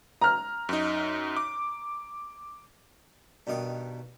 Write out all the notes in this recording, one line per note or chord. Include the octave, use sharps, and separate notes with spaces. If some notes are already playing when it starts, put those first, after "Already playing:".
A#5 F6
F#2 D#4
D6
G2 B2 D#3 D#6